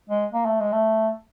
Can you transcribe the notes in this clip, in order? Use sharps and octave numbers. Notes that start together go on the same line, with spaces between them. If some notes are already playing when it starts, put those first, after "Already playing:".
G#3
A#3
A3
G#3
A3